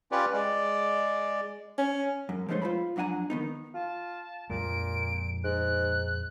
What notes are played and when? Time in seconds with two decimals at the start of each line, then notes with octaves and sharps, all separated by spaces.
0.12 C#4 F4 G4 B4 C#5 D5
0.33 G#3 D5
1.78 C#4
2.29 F#2
2.49 F3 G#3 A3 D#4 C5 C#5
2.62 F4 C5 B5
2.96 F2 F#3 D4 F#5 G#5 A#5
3.30 D#3 B3 D#4
3.74 F4 A5
4.50 A#1 F2 A#2 G#3 D7
5.44 G#2 F#6